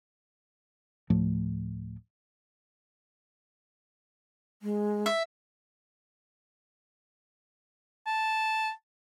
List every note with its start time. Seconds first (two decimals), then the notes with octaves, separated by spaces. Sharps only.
1.10 D2 A2 F3 A3
4.62 G#3
5.06 E5
8.07 A5